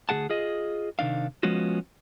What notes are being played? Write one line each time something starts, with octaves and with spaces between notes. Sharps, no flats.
D2 F3 G#4 F#5 A5
F4 G#4 D#5
C3 D#3 D4 F5
F3 G#3 B3 C#4 F4 F#4